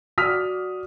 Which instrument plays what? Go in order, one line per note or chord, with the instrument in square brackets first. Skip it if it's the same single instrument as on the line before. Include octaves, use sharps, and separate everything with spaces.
[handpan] F#4 D5 [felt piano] D#6 F6 B6